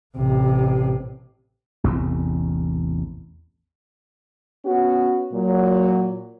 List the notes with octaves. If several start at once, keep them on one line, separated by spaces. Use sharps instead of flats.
A1 C3
A1 E2 C3 A3
B3 C#4 F#4
A#2 F#3